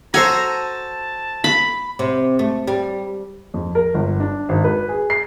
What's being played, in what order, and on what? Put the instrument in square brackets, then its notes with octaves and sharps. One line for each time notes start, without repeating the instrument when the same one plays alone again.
[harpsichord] F#4 A4 C5 [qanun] G#5 [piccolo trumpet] A#5
[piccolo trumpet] A5
[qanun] B5
[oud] C3
A3
G3
[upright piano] F2
A#4
G1
D4
G#1
B4
G#4
C7